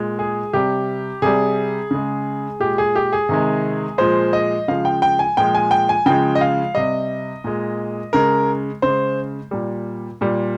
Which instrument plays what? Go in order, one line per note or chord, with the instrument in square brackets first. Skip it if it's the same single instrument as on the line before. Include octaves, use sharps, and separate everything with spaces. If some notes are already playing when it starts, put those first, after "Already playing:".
Already playing: [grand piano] A#2 G#3
G#4
C3 G3 G4
C3 G3 G#4
C#3 G#3
A#2 G#3 G4
G#4
G4
G#4
C3 D#3 G#3
A#2 F3 G#3 C5
D#5
C#3 F3 G#3 F5
G5
G5
G#5
A#2 F3 G#3 G5
G#5
G5
G#5
C#3 F3 G#3 G5
D#5
F5
C3 G3 D#5
A#2 G#3
C#3 G#3 A#4
C#3 G#3 C5
A#2 G3
A#2 G3